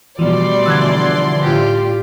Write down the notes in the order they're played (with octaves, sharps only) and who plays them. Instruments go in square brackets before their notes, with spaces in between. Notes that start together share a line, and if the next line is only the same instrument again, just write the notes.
[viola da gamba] B2 G3 A3 [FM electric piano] E3 F3 [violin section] D5 C6
[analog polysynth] D3 E3 F3 [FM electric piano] E6 F#6 G#6
[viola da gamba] A2 F4 G4